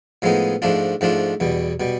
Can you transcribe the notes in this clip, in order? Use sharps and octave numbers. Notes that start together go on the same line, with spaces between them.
A2 F3 G#3 B3 D#4
G#2 F3 A3 D4 F4
G#2 F3 A3 D4 F4
E2 B2 G3
B2 G3